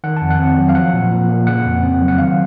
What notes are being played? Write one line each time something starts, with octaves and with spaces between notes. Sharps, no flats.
D#3 F#5
F2 A5
F#5
C4
F#3
F5
F3 F#5
A#2
A#2
A#3
C#3 F#5
F2
C4
F#3
F#5
D#3 F5